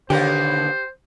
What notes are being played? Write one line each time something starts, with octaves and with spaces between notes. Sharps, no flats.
D#2 B2 D3 A#3 G4 C5